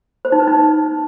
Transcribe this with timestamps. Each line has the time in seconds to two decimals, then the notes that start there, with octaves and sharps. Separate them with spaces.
0.25 C5
0.32 D#4
0.40 B4
0.48 D#4